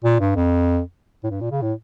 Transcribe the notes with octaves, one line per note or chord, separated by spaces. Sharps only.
A#2
G2
F2
A2
G2
A#2
C#3
A2